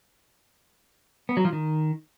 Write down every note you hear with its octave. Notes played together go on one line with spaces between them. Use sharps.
B3
F#3
F3
D#3